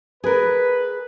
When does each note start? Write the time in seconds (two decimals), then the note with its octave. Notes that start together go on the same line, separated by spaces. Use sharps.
0.24 G#4 A#4 B4